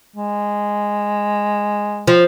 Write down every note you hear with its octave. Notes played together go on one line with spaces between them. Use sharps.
G#3
F3